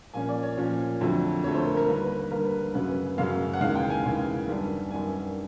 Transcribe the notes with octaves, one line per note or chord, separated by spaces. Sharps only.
A#2 F3 A#3 C#4 G#5
D5
C#5
A#2 F3 A#3 C#4
F2 D3 F#3 A3
F2 D3 F#3 A3 C#5
C5
A#4
A#4
D#2 D3 G3 A#3 B4
B4
B4
D#2 D3 G3 A#3 A#4
B4
F#2 C#3 F#3 B4
F#2 C#3 F#3 F5
F#5
D#2 C#3 E3 G#3 F5
G5
G#5
D#2 C#3 E3 G#3
F#2 D#3 G3 B3 D4
F#2 D#3 G3 B3 D4 G#5